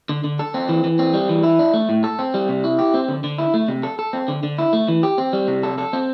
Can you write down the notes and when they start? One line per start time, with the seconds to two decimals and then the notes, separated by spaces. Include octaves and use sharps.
0.09 D3
0.24 D3
0.39 A4
0.54 C4
0.69 E3
0.84 E3
0.99 C4
1.14 G3
1.29 E3
1.43 E4
1.59 D4
1.74 A3
1.89 A2
2.04 A4
2.19 C4
2.34 G3
2.49 C3
2.64 E4
2.79 G4
2.94 C4
3.09 D3
3.24 D3
3.38 E4
3.54 A3
3.68 C3
3.83 A4
3.99 A4
4.13 C4
4.28 D3
4.43 D3
4.58 E4
4.73 A3
4.88 E3
5.03 G4
5.18 C4
5.33 G3
5.48 C3
5.63 A4
5.78 A4
5.93 C4